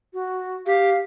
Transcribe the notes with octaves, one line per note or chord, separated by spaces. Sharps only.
F#4
G4 F5